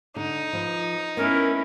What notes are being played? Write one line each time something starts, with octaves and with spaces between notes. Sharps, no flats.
D3 D#4
F3 B4
A3 B3 C#4 E4 A#4